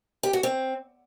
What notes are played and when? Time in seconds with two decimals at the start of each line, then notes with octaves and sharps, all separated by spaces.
0.23 G4
0.33 F#4
0.43 C4